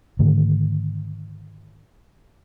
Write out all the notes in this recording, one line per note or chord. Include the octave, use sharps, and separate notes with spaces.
G#2 D3 D#3 A3